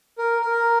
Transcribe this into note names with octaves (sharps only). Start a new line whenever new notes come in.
A#4
A#4